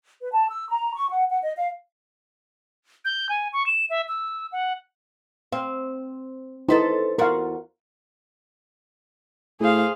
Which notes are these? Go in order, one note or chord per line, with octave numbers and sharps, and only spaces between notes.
B4
A5
E6
A#5
C#6
F#5
F#5
D#5
F5
G6
G#5
C#6
E7
E5
E6
F#5
C4 F5
D#4 E4 A4 B4 C5
E2 F4 F#4 A#4 F5
A2 G#4 C5 F5